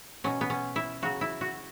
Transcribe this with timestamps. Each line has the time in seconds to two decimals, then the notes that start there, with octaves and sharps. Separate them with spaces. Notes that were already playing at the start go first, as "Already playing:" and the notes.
0.24 B2 F#3 C#4
0.41 B3
0.50 C#4
0.76 E4
1.02 C#3 F#3 F#4
1.21 E4
1.41 F#4